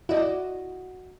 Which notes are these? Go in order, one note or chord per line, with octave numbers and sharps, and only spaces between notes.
E4 F#4 D5 D#5